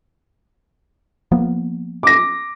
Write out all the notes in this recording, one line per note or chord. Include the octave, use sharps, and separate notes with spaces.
F3 A#3 B3
D6 A#6